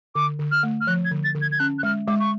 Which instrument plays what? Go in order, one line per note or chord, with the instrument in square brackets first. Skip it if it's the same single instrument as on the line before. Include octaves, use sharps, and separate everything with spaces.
[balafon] D3 [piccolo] D6
[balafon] D3
[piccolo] F6
[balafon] A3
[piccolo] F6
[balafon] F3 [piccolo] F#6
[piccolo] G#6
[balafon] D3
[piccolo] A6
[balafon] D3
[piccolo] G#6
G#6
[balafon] C#4 [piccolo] F#6
[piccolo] F#6
[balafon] G#3 [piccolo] F6
[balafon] G#3 [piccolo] D6
[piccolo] C#6